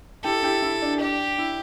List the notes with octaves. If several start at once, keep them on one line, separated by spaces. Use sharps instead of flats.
E4 G4 A4
E4 G4
E4
D4
D4 G4
E4